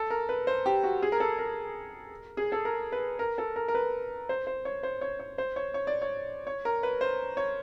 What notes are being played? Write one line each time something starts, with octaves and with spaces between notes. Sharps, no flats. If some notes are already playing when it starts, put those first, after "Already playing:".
Already playing: A4
A#4
B4
C5
G4
F#4
G#4
A#4
A4
A#4
G#4
A4
A#4
B4
A#4
A4
A#4
A#4
B4
C5
C5
C#5
C5
C#5
C#5
C5
C#5
C#5
D5
C#5
C#5
A#4
B4
C5
C#5